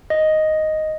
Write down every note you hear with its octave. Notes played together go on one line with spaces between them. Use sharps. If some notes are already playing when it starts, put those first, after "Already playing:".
D#5